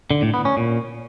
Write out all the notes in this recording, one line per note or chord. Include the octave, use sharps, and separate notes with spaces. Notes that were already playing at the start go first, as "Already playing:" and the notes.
D3
A2
B3
C#4
A#2